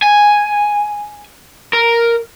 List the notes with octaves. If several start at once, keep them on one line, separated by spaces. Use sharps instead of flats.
G#5
A#4